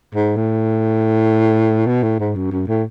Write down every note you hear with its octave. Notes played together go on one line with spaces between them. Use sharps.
G#2
A2
B2
A2
G#2
F#2
F#2
A2